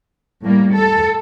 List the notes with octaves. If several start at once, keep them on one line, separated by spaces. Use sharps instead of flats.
A2 G3 A#3
A4